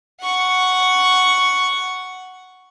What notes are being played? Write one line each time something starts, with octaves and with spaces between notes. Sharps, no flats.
F#5 C#6